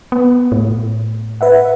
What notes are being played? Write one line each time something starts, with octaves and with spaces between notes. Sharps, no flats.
B3
A2
B4 E5 F#5